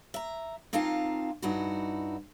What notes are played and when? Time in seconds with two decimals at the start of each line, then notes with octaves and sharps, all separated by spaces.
0.14 E5 A#5
0.73 A#3 C4 D#4 F4 F5 A5
1.42 G2 D#4 E4 F#4